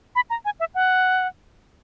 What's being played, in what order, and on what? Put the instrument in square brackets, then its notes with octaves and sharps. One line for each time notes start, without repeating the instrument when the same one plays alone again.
[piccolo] B5
A#5
G#5
E5
F#5